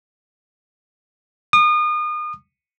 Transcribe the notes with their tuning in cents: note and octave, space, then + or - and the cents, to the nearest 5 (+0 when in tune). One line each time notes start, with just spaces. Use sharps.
D#6 -35